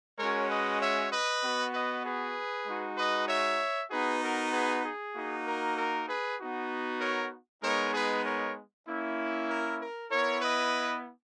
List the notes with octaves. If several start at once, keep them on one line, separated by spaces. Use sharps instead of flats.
G#3 C#4 F#4 A#4 C#5
B4 D#5
C#5 E5
B4 D#5
B3 F#4
B4 D#5
G#4 B4
G#3 D#4 F#4
B4 D#5
C#5 E5
B3 D#4 F#4 G#4 B4
A#4
G#4 B4
G#4
A#3 D#4 F#4
A#4
A#4
G#4 B4
B3 D#4 F#4
A#4 C#5
G#3 B3 D#4 A#4 C#5
G#4 B4
A#4 C#5
A#3 C#4 E4
A#4
A#4
B3 E4 A#4 C#5
B4 D#5